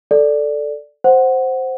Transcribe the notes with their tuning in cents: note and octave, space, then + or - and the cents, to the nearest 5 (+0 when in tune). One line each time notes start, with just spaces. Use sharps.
A4 +0 D5 +0
C5 +0 F#5 +0